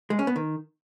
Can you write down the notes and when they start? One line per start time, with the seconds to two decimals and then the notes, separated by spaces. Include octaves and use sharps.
0.10 G#3
0.19 C#4
0.27 B3
0.36 D#3